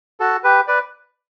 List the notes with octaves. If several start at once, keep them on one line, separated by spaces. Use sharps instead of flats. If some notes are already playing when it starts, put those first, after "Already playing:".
F#4 A4
G4 B4
B4 D5